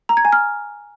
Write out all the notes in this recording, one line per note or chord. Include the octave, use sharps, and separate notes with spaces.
A#5
G#6
G#5
F6